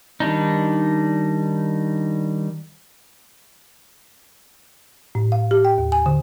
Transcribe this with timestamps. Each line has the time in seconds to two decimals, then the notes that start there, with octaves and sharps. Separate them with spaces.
0.20 D#3 G3 D4 D#4
5.15 A2
5.32 F5
5.51 G4
5.65 G5
5.78 D#2
5.92 G#5
6.06 D3